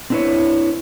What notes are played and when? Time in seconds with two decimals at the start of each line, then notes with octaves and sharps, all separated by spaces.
0.10 C4 D4 E4 A#4 B4 C#5